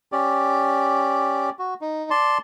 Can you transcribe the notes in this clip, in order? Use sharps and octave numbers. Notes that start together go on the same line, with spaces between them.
C#4 G4 D5
F#4
D#4
D5 A5 C6